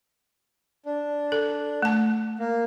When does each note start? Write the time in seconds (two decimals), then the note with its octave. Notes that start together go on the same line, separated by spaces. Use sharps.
0.86 D4
1.32 A4
1.82 A3 A5
2.39 A#3